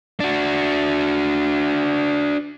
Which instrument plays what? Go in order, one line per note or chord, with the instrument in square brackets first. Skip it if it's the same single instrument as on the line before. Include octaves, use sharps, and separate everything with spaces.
[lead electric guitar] D4 F#4